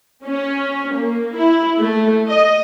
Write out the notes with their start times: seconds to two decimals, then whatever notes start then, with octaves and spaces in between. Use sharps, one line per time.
0.25 C#4
0.95 A#3
1.37 E4
1.79 A3
2.29 D#5